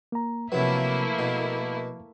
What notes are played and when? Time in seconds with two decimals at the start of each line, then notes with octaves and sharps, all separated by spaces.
0.12 A#3 A#5
0.52 C3 F3 F#3 A3 A#3 E4 B4
1.19 B2